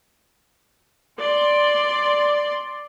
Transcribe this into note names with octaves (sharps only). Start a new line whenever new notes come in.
D5 C6